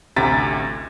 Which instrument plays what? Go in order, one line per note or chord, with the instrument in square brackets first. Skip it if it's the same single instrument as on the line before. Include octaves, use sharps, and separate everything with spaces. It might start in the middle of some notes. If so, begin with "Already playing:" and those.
[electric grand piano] A1 D2 C3 A#5 A6 B6